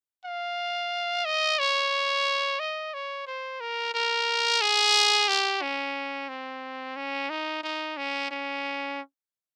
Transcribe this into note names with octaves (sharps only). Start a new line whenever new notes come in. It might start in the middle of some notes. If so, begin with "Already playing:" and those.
F5
D#5
C#5
D#5
C#5
C5
A#4
A#4
G#4
G4
C#4
C4
C#4
D#4
D#4
C#4
C#4